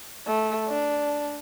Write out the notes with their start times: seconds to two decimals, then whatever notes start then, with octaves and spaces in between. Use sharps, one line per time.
0.27 A3
0.68 D4